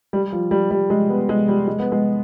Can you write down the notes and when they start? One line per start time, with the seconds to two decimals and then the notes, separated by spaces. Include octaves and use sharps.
0.13 G3
0.32 F3
0.51 G3
0.71 G3
0.90 G#3
1.10 B3
1.29 G#3
1.48 G3
1.67 G#3
1.79 B3
1.92 G#3